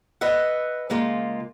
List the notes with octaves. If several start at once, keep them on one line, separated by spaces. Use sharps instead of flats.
B4 D#5 E5 F#5
C#3 G#3 A#3 F4